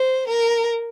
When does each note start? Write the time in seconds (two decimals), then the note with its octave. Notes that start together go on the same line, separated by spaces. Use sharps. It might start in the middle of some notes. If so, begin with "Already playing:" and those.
Already playing: C5
0.28 A#4